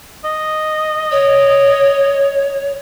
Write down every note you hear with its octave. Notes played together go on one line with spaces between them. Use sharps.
D#5
C#5